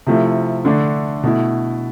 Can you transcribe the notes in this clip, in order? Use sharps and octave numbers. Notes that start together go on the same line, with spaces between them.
C3 F3 A3 E4
D3 A3 D4
B2 A3 E4